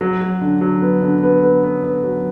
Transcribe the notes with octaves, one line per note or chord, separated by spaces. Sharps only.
F#3
F#3
D3
F#3
B3
D3
B3
B3
B3
B3
F#3